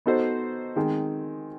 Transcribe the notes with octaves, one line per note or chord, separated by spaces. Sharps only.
B3 D#4 F#4 A4 C5
D#3 G#3 C4